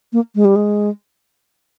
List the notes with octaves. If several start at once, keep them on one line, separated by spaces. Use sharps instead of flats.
A#3
G#3
G3
G#3